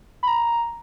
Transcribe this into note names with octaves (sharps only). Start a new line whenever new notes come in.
B5
A#5